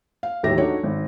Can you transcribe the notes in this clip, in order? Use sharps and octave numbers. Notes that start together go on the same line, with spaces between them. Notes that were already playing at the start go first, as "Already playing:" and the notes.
F5
A1 D#2 F#3 G4 E5 A#6
D4 D#4 F#4 A4 C#5
G#1